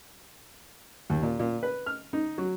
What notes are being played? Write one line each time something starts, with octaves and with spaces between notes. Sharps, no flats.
D#2
A#2
A#2
B4
F6
D#4
F#3